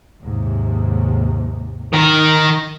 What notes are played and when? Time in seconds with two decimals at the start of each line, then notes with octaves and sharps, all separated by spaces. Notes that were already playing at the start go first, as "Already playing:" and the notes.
0.22 D#2 G#2 C3
1.93 D#3 A#4